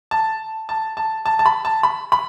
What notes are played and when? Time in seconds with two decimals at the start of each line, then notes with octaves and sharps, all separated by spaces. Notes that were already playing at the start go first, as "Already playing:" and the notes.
0.11 A5
0.69 A5
0.97 A5
1.26 A5
1.39 A5
1.46 B5
1.65 A5
1.83 B5
2.12 B5